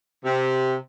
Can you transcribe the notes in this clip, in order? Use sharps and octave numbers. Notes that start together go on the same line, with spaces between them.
C3